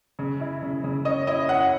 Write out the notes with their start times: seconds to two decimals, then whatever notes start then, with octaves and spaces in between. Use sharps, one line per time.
0.19 C#3
0.40 E4
0.62 C#3
0.84 C#3
1.05 C#4 D#5
1.27 E4 D#5
1.49 C#4 F#5